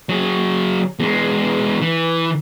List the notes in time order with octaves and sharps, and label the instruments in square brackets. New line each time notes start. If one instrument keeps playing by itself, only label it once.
[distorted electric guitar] F#3 G#4
E2 G#3
E3